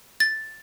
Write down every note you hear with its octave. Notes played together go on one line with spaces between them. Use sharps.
A6